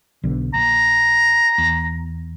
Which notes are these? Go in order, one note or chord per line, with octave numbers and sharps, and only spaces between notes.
B1 D3
A#1 A#5
E2